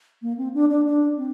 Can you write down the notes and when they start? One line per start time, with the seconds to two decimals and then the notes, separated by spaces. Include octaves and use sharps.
0.22 A#3
0.37 C4
0.54 D4
0.70 D4
0.86 D4
1.17 C4